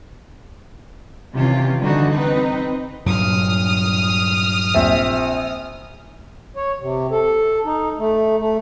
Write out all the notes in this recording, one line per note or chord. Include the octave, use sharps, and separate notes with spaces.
C3 D#3 E3 C#4 F4 G4
D3 E3 G3 D4 D#4 F#4
C4 D#4 B4
G2 A#2 F#3 D#6 F6
A#1 C4 E5
C#5
C3
A4
D#4
A3
A3